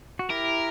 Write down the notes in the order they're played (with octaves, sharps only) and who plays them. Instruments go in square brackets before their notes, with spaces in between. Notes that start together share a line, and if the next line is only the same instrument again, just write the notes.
[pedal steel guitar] F#4
[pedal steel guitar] E4 G4 [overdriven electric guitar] A#4